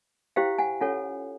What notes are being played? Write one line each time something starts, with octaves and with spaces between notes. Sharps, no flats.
E4 G4 C5 F5 G5
F#5 G#5
C#4 F4 A4 C#5 F#5 G#5